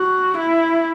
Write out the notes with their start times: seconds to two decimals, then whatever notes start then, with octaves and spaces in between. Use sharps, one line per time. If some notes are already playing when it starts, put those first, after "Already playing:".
Already playing: F#4
0.37 E4